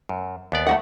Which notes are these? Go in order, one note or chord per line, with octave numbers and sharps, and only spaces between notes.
F#2
D#2 B3 D5
A3 F#4 F#5